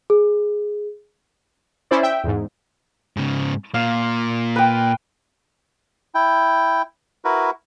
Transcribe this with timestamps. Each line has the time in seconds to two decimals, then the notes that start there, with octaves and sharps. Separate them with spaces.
0.10 G#4
1.91 C#4 E4 C5 D5
2.03 E5 G5
2.24 E2 G#2
3.17 G#2 C#3
3.74 A#2 F5
4.56 B4 G5
6.15 E4 G5
7.25 E4 F#4 A#4 B4